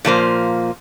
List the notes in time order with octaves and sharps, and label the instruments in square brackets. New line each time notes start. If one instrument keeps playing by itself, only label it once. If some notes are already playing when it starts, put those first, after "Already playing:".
[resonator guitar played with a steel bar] A#2 F3 A#3 C5